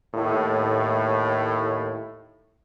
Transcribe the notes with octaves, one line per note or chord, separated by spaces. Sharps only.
D#2 A2